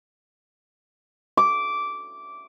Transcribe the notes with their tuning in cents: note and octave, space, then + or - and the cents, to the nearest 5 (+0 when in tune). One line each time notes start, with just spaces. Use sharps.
D6 -10